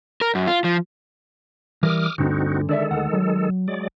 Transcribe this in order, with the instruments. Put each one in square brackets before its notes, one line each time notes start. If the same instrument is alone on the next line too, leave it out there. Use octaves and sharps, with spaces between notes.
[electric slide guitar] A#4
F#2
F4
F3
[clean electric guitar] E3 G3 A#4 [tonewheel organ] D6 D#6 F6
[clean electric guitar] D2 G2 D3 [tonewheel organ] C4 D#4 F#4
[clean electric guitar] D3 D5 E5 [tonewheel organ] D#3 G#3 A4
[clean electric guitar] D2 F#5
F#3
[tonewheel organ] F#3 G#3 D5